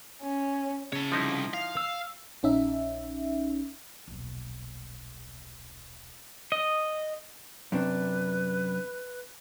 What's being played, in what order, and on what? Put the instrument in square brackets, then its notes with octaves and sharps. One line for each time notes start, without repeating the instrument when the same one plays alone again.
[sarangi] C#4
[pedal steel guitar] C#3 [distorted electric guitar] C#5 A5
[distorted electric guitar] C2 [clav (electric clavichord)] F3 D#4 E4
[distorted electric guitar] F5
[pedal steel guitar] E6
[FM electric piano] A#1 C#4 D#4 E5
[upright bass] D#1 B1
[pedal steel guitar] D#5
[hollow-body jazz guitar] F#2 C3 D4 [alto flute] B4